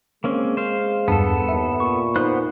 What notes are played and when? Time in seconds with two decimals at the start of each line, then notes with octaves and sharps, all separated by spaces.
0.24 G#3 A#3 C4 C#4
0.57 C5 F5
1.08 E2 G2 B3 A4 A5
1.49 D#2 E5
1.80 A#2 C#6
2.16 B3 D#4 C5 F#6